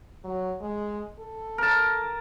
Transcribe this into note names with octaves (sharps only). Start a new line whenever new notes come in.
F#3
G#3
A4
A#4 A5